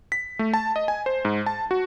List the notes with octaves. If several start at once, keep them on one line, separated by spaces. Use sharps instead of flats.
B6
A3
A5
D#5
G#5
C5
G#2
A5
F#4